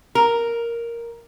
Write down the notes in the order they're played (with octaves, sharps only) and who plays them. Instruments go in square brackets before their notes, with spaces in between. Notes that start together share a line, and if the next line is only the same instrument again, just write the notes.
[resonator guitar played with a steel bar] A#4